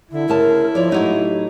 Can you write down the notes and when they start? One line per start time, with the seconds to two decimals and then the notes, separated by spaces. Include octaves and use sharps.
0.11 D3 E4
0.29 D2 C#3 A#4 A5
0.75 F3 C#5 D5
0.92 A2 F#3 D#4 G4